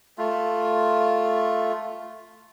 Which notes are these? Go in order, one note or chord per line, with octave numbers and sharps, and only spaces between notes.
A3 F4